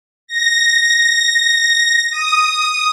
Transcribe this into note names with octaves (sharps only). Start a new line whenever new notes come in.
A#6
D#6